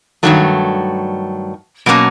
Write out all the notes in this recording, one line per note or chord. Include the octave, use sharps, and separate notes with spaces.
G2 D#3 F#3 A3
B2 F#3 A#3 C#4